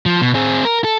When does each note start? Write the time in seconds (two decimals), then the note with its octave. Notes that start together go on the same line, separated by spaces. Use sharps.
0.06 F3
0.21 B2
0.35 C4 G#4
0.65 A#4
0.84 A4